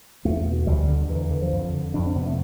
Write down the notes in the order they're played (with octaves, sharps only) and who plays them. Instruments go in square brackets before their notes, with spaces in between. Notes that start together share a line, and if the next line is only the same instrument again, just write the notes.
[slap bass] E2 A3
B2
D2 G3
D3
E2 E3
E3
D3 E3
F3
F2
D3
F2 D4
C4
C3 B3
A3